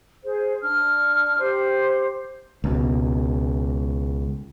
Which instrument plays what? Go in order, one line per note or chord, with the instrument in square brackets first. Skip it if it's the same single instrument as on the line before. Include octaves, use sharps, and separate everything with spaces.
[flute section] G#4 C5
D4 F6
G4 C5
[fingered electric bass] C#2 B2